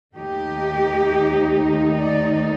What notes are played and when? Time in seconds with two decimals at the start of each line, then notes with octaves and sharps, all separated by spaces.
0.16 D#2 D#3 A3 D#4 G4
1.98 D5